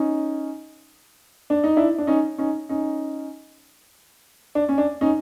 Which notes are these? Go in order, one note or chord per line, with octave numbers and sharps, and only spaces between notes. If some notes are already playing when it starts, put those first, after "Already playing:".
Already playing: C#4 D#4
D4
D#4
D4 E4
D4
C#4 D#4
C#4 D#4
C#4 D#4
D4
C#4
D4
C#4 D#4